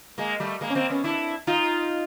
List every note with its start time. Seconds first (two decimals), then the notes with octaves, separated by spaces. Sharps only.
0.18 G#3 A#3
0.40 G3 A3
0.61 G#3 A#3
0.70 C#4
0.75 A#3 C4
0.90 B3 C#4
1.04 D4 E4
1.47 D#4 F4